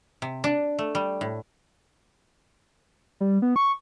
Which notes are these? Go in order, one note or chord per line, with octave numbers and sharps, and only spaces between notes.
C3
D4
A3
G3
A2
G3
B3
C#6